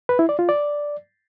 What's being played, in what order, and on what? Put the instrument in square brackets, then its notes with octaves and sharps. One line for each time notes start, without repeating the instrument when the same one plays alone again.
[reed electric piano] B4
E4
D5
F4
D5